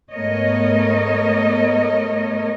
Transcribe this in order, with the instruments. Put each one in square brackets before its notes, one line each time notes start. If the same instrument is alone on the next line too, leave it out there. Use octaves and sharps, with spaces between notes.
[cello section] G#2 A3 B3 A#4 C#5 D#5